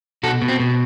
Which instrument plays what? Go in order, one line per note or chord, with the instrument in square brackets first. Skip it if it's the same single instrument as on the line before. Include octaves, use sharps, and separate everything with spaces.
[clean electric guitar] B2 F#4 A4
B2
C4
B2